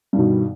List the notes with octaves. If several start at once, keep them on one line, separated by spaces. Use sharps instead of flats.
G2 B2 D#3